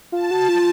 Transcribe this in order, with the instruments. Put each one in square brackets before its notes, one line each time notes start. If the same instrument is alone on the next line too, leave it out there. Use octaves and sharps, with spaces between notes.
[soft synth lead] F4 [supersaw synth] A5
[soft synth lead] F#4
F4